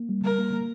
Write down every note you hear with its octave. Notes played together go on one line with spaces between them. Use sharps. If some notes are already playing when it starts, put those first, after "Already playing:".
Already playing: A#3
G3
G3 A#4
A#3
A#3